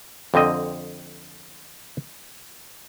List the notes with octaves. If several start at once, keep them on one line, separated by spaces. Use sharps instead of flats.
F2 D3 C4 D#5